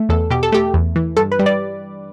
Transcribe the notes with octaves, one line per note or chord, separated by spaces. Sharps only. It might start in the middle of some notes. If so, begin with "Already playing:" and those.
Already playing: A3
E2 A4
B2 G4
A4
A3 G4
E2
E3
G2 A4
B4
G3
D5